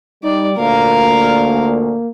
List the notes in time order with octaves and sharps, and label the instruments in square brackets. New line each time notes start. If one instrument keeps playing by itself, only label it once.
[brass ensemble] G3 [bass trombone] D#4 [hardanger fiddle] D5
[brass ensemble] D2 A#2 [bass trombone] A#3 [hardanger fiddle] A#4 F5